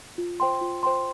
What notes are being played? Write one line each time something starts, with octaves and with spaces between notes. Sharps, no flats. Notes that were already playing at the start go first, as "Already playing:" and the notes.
F4
C5 G5 C6
F4
C5 G5 C6